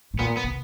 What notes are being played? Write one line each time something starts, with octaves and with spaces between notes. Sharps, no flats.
A2
A#2 B3
B3
C3